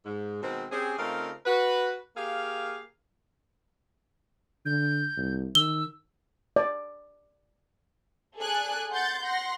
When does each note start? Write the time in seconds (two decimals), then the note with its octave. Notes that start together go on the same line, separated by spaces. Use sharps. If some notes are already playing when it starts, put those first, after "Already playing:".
0.05 G#2
0.42 B2 D#3 G#3 C4
0.72 C4 C#4 G4 G#4
0.98 C#3 A3 C4 D#4 F4 A#4
1.46 F#4 B4
2.16 A#3 G4 G#4 F5
4.65 D3 G6
5.17 C2
5.55 D#3 E6 G7
6.56 D5
8.37 G#4 A4 D5 G#5 F#6
8.92 F#5 C6 G6 A6
9.22 F#5 C6 A#6